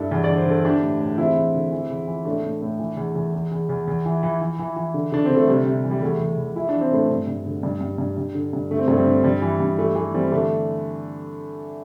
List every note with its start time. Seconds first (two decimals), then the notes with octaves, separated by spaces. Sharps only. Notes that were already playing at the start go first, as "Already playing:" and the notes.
Already playing: G2 E4 A4
0.11 E2
0.24 D3 D5
0.37 C5
0.46 D3 A4
0.64 E3 D4 G4
0.82 A2
1.00 A2
1.18 E2 C4 E4
1.36 E2
1.54 D3
1.72 E3
1.90 E2
2.08 E3
2.25 A2 A3 D4
2.44 A2
2.62 A2
2.79 E3
2.97 E2
3.15 E2
3.33 E2
3.52 E2
3.69 E2
3.88 E2
4.05 E3
4.23 E3
4.41 E3
4.59 E3
4.76 E3
4.94 D3
5.12 D3 D4
5.25 D3 C4
5.37 A3
5.48 C3 G3
5.66 C3
5.84 E3
5.91 G3
6.02 E2 A3
6.20 E2
6.37 E2
6.56 E3 E4
6.69 E3 D4
6.81 C4
6.91 A2 A3 D4
7.10 G2
7.27 G2
7.46 D3
7.63 G2 G3
7.81 G2
7.98 G2
8.17 G2
8.35 D3
8.53 G2
8.71 D3 A3
8.79 C4
8.88 G2 A3
8.97 G3 C4
9.06 D3
9.24 G2 G3
9.42 E3
9.60 G2
9.78 E3 A3
9.95 E3 A3
10.14 E3 G3 C4
10.32 D3 A3 D4